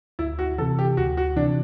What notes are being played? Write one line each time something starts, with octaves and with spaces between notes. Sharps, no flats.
D2 E4
F#4
C3 E3 A4
G4
D2 F#4
F#4
C3 E3 D4